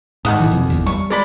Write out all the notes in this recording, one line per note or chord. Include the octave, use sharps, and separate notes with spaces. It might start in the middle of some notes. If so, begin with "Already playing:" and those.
D#2 G#2 F#5 D#6
F#1 A2 E3
F2 C3
G1 E2 D3
G3 C#6
G#3 D5 B5